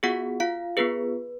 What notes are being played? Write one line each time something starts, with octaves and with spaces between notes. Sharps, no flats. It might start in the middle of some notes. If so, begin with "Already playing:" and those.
B3 F4 F#4 G#4 F#5
F4 F5
B3 F4 G#4 B4